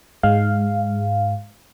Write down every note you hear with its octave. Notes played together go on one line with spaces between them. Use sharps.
G#2 G#3 F5